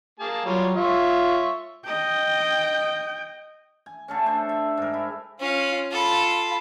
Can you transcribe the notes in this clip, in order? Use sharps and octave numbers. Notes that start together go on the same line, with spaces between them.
A#3 G#4 A5
F#3 G3 F4 C#5
F4 C#5 E5 C#6
D#5 G5
G#5
D3 A3 C#4
D4 C5 E5
E5
G#2 A#4
E4
C#4 F4 F5
F4 A4 B5